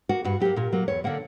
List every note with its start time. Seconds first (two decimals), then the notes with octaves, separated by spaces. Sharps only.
0.09 A#3 F#4
0.24 G2 F#4
0.40 F#3 A#3 G4
0.56 A#2 A#4
0.72 F#3 A#3
0.88 E2 C#5
1.04 D3 A#3 F#5